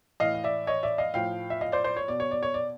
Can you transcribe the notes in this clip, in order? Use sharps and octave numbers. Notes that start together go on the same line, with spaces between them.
A2 E3 D#5 F5
F5
D5 E5
C#5 D#5
D5 E5
D#5 F5
A2 F3 F5 G5
E5
D#5 F5
C5 D5
C5 D5
C#5
B2 D5
C#5
D5
C#5
D5